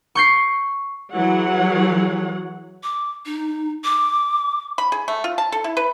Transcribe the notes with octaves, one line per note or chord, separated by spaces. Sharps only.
C#6 G6 C7
E3 F#3 G#4 C#5 F#5
D6
D#4
D6
B5
G#4
A3
F4
A5
A4
E4
B4